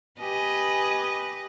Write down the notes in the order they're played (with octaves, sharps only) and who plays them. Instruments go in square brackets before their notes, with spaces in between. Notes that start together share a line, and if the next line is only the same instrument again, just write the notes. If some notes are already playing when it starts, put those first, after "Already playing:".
[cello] G4 [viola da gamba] B4 D#5 [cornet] G#5